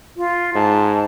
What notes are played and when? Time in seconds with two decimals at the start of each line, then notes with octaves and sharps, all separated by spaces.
0.17 F4
0.55 G#2 A5